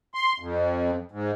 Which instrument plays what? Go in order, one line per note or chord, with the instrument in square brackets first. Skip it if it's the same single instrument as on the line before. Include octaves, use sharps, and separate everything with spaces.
[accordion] C6
F2
G#2